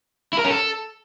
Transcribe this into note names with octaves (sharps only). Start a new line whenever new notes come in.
E4
A#4
C#4
A4